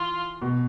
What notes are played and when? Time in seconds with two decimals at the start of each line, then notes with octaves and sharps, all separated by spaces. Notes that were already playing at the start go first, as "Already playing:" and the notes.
Already playing: E3 F4
0.42 B2